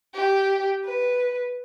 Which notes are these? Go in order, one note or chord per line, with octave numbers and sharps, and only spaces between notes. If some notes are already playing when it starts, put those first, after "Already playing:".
G4
B4